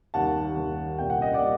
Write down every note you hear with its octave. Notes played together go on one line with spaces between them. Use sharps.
D#2 D#3 G3 F#5 A5
D#2 D#3 G3
C2 A#2 G3 G5
F#5
D#5
D5 F#5
A#2 G3